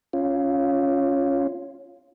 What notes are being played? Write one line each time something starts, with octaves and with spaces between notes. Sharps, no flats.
C#4 F4